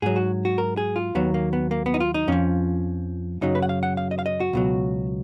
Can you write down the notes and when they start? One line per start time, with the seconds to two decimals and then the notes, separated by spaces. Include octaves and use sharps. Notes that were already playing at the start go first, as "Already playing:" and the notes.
0.02 G#2 F#3 G#4
0.16 F#4
0.45 F#4
0.58 A#4
0.77 G#4
0.96 F4
1.15 D#2 D#3 F#3 B3
1.34 A#3
1.53 B3
1.71 A#3
1.86 B3
1.94 D#4
2.00 F4
2.14 D#4
2.28 F2 F3 C#4
3.41 F#2 C#3 F#3 D#4
3.55 B4
3.62 F#5
3.69 F5
3.83 F#5
3.97 F5
4.11 D#5
4.19 F5
4.26 D#5
4.40 F#4
4.53 C#2 B2 F#3